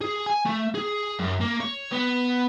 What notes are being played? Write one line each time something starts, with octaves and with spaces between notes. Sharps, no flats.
G#4
G#5
A3
G#4
F#2
A#3
C#5
B3